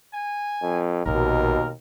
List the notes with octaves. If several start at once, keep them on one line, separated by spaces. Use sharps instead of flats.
G#5
F2
A#1 D#2 B2 A#4